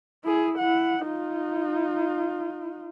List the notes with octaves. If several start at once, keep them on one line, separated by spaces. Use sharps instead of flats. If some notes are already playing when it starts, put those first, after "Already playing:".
E4 G#4
E4 F#5
D#4 F4